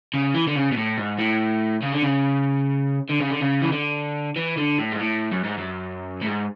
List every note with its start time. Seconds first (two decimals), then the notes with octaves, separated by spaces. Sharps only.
0.14 C#3
0.34 E3
0.47 D3
0.55 C#3
0.72 B2
0.77 A2
0.98 G#2
1.19 A2
1.82 C#3
1.92 D3
2.02 C#3
3.09 D3
3.20 C#3
3.30 D3
3.41 C#3
3.62 E3
3.72 D3
4.36 E3
4.57 D3
4.78 A2
4.92 G#2
4.99 A2
5.31 F#2
5.44 G#2
5.58 F#2
6.21 A2
6.26 G#2